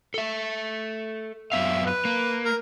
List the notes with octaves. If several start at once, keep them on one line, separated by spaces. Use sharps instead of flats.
A4 E5
F#2 B3 E5 F5
B4
A#3
A#4